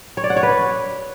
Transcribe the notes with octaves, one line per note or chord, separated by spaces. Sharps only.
C#5
D5
F#5
C#5
B4